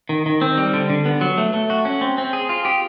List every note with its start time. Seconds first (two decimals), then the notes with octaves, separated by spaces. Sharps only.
0.09 D#3
0.26 D#3
0.41 C4
0.58 G3
0.73 D3
0.90 D3
1.06 B3
1.21 F#3
1.38 A3
1.54 A3
1.70 F#4
1.85 C#4
2.01 C4
2.18 C4
2.33 G#4
2.49 F4
2.65 G4